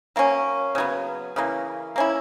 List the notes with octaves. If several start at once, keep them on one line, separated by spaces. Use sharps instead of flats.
F#3 A#3 C#4
C#3 F#3 B3
C#3 E3 A#3
A#3 C#4 E4